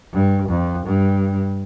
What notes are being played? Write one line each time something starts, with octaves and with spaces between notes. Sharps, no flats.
G2
F2
G2